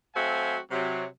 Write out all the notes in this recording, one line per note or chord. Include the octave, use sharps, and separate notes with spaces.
F#3 A3 C4 F#4 F5 G#5
C3 F#3